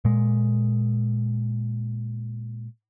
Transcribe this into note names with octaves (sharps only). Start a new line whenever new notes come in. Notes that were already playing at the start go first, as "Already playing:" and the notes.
A#2 G#3